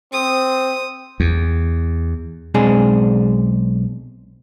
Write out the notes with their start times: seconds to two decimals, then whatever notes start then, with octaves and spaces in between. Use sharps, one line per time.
0.13 C4 D#6
1.20 E2
2.54 B1 G#3 C4 D4 G#4